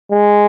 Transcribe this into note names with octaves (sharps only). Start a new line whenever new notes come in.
G#3